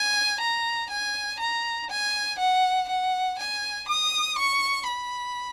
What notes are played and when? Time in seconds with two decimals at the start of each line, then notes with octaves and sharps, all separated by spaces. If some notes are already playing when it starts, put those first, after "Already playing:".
Already playing: G#5
0.41 A#5
0.90 G#5
1.40 A#5
1.90 G#5
2.39 F#5
2.89 F#5
3.39 G#5
3.89 D#6
4.39 C#6
4.88 B5